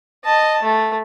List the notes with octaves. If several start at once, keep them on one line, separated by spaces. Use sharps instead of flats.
D#5 A5
A3